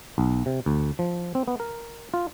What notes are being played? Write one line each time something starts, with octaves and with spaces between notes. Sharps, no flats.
B1
C3
D2
F3
C4
B3
A#4
F4